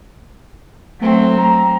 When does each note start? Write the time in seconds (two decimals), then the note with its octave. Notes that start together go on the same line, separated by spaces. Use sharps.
1.01 F#3 A3 C4
1.38 A#5